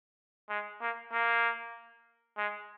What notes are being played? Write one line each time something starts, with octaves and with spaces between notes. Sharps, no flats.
G#3
A#3
A#3
G#3